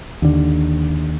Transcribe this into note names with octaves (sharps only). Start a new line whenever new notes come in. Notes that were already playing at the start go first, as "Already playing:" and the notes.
D#2 D3